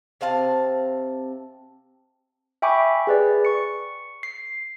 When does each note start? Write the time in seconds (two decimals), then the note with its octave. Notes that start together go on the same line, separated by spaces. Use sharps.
0.21 C3 C4 F5 A5
2.62 E5 G5 G#5 B5 C#6 D6
3.07 G#4 B4 D5
3.45 C#6 C#7
4.23 C7